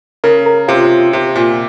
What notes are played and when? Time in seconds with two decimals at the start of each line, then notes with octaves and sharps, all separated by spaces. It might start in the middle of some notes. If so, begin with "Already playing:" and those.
0.24 C#3 A#4
0.46 A#4
0.68 C3 F4
1.13 C3
1.36 A#2